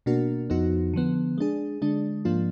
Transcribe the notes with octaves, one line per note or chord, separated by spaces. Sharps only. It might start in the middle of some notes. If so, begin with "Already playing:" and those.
B2 A#3 D4 F#4 A#4
F2 F3 B3 D#4 F#4
D3 F3 B3
G#3 D4 G#4
D3 G#3 D4
G#2 F3 A#3 D4 F4